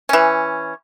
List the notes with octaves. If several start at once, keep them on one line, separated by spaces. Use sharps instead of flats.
E3 C#4